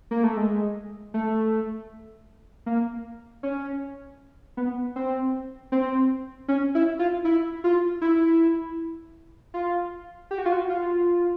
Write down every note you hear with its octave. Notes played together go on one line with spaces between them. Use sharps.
A#3
A3
G#3
A3
A#3
C#4
B3
C4
C4
C#4
E4
F4
E4
F4
E4
F4
G4
F#4
F4
F#4
F4